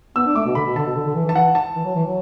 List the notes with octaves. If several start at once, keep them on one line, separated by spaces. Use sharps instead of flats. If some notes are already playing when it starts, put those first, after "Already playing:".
B3 E6
D4
A3 D6
B2
D3 B5
B2
D3 A5
B2
D3
D3
E3
E3
A5
E3 F#5
A5
E3
F#3
E3
F#3